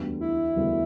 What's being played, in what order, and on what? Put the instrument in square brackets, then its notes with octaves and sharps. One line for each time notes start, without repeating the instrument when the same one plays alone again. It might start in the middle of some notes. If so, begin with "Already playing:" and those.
Already playing: [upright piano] E1 D2 D3 G3 B3
[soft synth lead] E4
[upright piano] E1 D2 D3 G3 B3